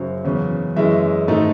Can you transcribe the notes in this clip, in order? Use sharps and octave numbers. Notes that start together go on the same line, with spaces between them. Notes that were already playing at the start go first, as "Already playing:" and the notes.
Already playing: F#2 C#3 F#3 C5
E2 C#3 F#3 C#4
F#2 E3 G#3 C#4 E5
G#2 D#3 A3 D#4